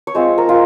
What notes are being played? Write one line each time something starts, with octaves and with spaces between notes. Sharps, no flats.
C#5
G#3 C4 F4 C5
A#4
F4